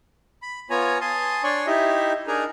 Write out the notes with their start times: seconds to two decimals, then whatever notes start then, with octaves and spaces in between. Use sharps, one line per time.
0.42 B5
0.70 B3 F4 C#5 G#5 A#5
1.01 G#5 A5 C6 D#6
1.44 D4 C#5 D5 G#5 C6 C#6
1.67 D#4 E4 G4 D#5 E5
2.28 D4 D#4 G#4 A#4 G#5 A#5